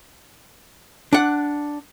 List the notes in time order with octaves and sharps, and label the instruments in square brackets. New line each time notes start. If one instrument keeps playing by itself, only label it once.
[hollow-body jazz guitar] D4 F#5